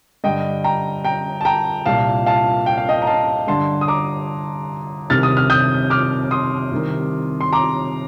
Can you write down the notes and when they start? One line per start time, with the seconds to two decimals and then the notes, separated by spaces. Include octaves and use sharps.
0.24 G2 D3 D#5 G5
0.64 G5 A#5
1.04 G5 A#5
1.41 A5
1.45 G5 A#5
1.86 C2 A#2 F5 A5
2.26 F5 A5
2.66 G5
2.78 F5
2.89 D#5 G5
3.02 A#5
3.07 F5 A5
3.47 G2 D3 A5 C6
3.81 D#6
3.88 A#5 D6
5.10 C2 C3 D#3 F6 A6
5.23 D#6
5.37 F6
5.50 D#6 G6
5.90 D6 F6
6.31 C6 D#6
6.71 C2 C3 D#3
7.41 C6
7.53 A#5 D6